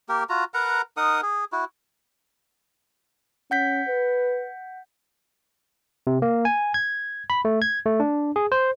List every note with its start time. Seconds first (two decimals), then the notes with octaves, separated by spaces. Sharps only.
0.09 A#3 G4 A#4
0.29 F4 F#4 A#5
0.54 A#4 B4 F#5 A#5
0.97 D#4 A#4 F#5 D#6
1.23 G#4
1.52 E4 F#4
3.51 C#4 F#5 G6 B6
3.88 B4
6.07 C3
6.22 A#3
6.45 G#5
6.74 G#6
7.30 B5
7.45 A3
7.62 G#6
7.85 A3
8.00 D4
8.36 G#4
8.52 C5